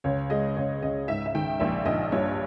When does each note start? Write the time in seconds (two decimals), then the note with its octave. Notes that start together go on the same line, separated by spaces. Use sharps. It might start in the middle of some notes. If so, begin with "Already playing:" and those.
0.04 C#2 C#5
0.30 G#3 D#5
0.57 C#2 C#5
0.82 C#2 D#5
1.08 G#2 E5
1.26 E5
1.35 D#3 G5
1.60 A#1 E5
1.86 A#1 D#5
2.12 G2 C#5